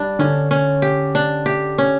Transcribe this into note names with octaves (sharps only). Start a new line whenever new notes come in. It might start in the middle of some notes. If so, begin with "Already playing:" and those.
Already playing: G3 D4
D3 C#4
C#4
G4
D4
G4
C#4